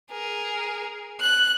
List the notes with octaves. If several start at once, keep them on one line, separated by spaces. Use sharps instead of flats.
G#4 A#4
F#6